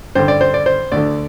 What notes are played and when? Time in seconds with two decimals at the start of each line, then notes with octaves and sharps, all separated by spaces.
0.15 G2 D3 C5
0.28 D5
0.41 C5
0.54 D5
0.66 C5
0.92 D2 D3 D5